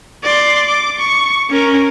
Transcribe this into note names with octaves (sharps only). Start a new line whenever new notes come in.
D5 C6
D6
C#6
C#4 A#4